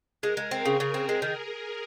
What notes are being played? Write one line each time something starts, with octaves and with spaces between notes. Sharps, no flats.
G#3 A#4
G#3
C4
C#3 G#4
C#3
C4
G#3
D#3